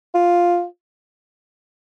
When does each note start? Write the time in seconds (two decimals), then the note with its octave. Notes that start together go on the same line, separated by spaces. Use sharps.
0.15 F4